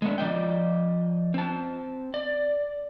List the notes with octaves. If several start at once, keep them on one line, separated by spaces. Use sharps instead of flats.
G#3 A3 B3 D4
F3 D5 D#5 G5
C4 A5
D5